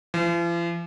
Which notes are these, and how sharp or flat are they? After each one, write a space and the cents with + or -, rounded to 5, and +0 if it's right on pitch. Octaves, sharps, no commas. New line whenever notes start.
F3 -45